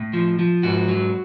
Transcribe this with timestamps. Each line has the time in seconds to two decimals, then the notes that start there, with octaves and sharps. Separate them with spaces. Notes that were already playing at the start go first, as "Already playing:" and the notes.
Already playing: A2
0.13 F3
0.39 F3
0.63 G#2 F#4
0.88 F#3